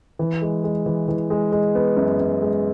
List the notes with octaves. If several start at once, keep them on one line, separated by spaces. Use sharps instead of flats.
E3
G#3
G#3
E3
E3
G#3
G#3
B3
F#2
B3
G#3